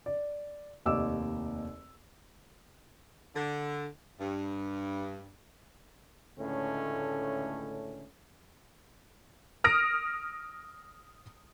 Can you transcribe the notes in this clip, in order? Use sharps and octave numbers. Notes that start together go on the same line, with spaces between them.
D5
F1 D#2 D#5 D6 E6
D3
G2
C#2 A2 D3 A3 C#4
D#6 F6 A#6 D7